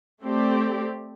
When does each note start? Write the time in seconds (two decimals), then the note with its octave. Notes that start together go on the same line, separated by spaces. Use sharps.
0.22 A3 C4 G4 D5